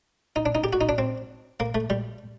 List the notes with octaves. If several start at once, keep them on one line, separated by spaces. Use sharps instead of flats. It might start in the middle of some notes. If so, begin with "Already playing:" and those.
D#4
D4
D#4
G4
F#4
D#4
D4
C4
A#3
A3
G3